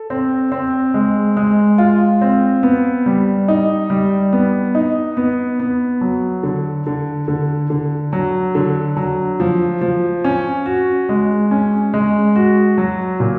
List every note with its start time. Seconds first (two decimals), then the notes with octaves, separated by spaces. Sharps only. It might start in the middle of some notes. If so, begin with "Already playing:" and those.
Already playing: A4
0.10 C4
0.52 C4
0.94 G#3
1.37 G#3
1.78 F4
2.21 C4
2.63 B3
3.06 G3
3.48 D#4
3.90 G3
4.33 B3
4.75 D#4
5.17 B3
5.59 B3
6.01 F#3
6.43 D3
6.86 D3
7.28 D3
7.70 D3
8.13 F#3
8.55 D3
8.97 F#3
9.40 F3
9.81 F3
10.24 C#4
10.66 F#4
11.09 G#3
11.51 C#4
11.94 G#3
12.36 F#4
12.78 F#3
13.20 A#2